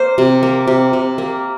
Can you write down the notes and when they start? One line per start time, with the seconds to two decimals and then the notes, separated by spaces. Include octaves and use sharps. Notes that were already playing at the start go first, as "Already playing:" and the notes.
Already playing: A#3 C5
0.18 C3
0.43 A#3
0.67 C3
0.93 C3
1.18 A#3